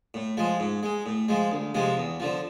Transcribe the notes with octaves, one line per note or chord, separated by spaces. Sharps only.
A2
F3 G#3
G#2
G#3
A2
F3 G#3
D2
C3 F3 G#3
E2
D3 F3